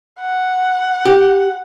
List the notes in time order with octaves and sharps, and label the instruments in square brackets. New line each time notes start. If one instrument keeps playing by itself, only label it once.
[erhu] F#5
[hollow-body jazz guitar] G4